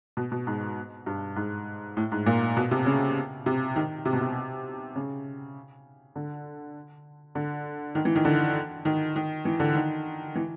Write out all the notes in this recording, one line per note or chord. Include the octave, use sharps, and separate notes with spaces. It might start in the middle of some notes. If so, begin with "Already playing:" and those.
B2
B2
G#2
G2
G#2
A2
G#2
A#2
B2
C3
C#3
C3
D#3
C3
B2
C3
C#3
D3
D3
D#3
E3
D#3
D3
D#3
D#3
E3
D3
D#3
E3